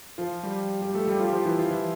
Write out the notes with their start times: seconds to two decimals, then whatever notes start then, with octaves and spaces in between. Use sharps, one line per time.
0.18 F3 F4
0.43 G3 G4
0.81 G3 G4
0.94 A3 A4
1.07 G3 G4
1.20 F3 F4
1.28 G4
1.33 F3 F4
1.45 E3 E4
1.58 F3 F4
1.71 E3 E4